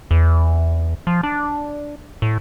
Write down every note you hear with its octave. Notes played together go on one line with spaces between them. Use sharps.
E2
F3
D4
A2